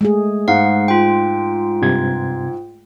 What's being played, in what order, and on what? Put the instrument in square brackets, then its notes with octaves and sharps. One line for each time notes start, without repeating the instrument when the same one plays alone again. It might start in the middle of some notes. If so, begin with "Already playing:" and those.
[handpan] G#3 A3 G#4
[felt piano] G#2 [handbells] F5 F#5
[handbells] F4 G5
[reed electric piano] G2 C3 G#6